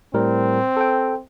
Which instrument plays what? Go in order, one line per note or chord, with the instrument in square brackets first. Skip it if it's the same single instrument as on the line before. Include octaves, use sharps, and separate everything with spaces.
[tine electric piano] A2 G3 A#4 [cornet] C4
[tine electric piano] A4 G5